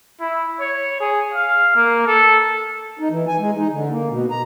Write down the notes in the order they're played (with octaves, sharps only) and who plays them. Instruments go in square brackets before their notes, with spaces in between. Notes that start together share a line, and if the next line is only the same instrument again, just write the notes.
[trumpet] E4
C#5
G#4
F5
A#3
A4
[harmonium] D#4
E3
G#5
G#3
D#4
D3
A#3
B2
A#5